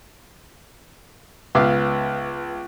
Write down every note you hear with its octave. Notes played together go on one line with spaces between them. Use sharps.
C#2 B3 E5 F5 D6